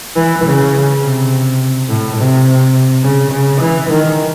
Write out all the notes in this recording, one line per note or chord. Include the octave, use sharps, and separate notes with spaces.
E3
C#3
C3
A2
C3
C#3
C#3
E3
D#3